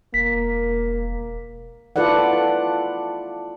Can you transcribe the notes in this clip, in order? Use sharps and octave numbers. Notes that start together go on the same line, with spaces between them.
E1 A#3 B6
E4 F4 A4 B4 D5 F#5